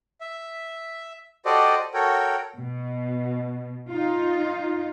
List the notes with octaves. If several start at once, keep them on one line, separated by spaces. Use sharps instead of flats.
E5
F#4 G4 A4 C5 D5 D#5
F#4 A4 A#4 C#5 G5
B2
D#4 F4